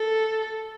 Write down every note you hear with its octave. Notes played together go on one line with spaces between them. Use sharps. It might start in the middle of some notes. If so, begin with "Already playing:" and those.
Already playing: A4